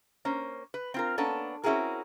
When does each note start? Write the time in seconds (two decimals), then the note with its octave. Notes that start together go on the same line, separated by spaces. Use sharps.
0.25 A#3 C#4 C5
0.74 B4
0.94 C4 F4 A#4
1.18 A#3 B3 C#4 D4 A4
1.64 C4 C#4 E4 F#4 G#4 A#4